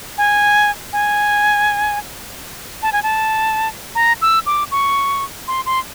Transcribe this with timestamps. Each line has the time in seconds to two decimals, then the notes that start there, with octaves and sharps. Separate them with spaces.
0.18 G#5
0.93 G#5
2.83 A5
2.92 G#5
3.03 A5
3.95 A#5
4.22 E6
4.46 D6
4.71 C#6
5.48 C6
5.66 C6